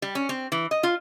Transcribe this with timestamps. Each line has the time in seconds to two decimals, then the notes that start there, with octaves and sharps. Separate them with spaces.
0.02 G3
0.15 C#4
0.29 C4
0.52 E3
0.71 D#5
0.83 F4